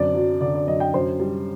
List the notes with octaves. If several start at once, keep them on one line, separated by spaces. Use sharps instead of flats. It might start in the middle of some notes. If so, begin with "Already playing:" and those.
Already playing: F#2 D3 C4 D5
F#3
D3 D5
D5
F#2 D#5
G5
F#2 C5
G3